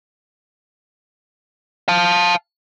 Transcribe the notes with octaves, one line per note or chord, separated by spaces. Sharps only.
F5 A5